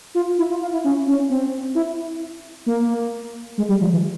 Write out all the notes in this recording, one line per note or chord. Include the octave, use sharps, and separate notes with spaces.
F4
E4
F4
F4
E4
C#4
C#4
C4
E4
A#3
G#3
G3
F3
E3